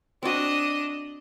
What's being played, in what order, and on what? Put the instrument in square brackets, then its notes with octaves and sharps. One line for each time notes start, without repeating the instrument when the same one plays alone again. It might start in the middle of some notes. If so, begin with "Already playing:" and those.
[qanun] C4 F#4 [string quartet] D4 D#5